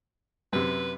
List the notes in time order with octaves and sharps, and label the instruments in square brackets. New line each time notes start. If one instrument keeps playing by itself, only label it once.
[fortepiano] F#2 C3 [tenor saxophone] B4